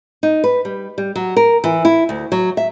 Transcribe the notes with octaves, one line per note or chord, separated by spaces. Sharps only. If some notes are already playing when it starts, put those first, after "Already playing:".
D#4
B4
G3
G3
F#3
A#4
E3
E4
D2
F#3
E5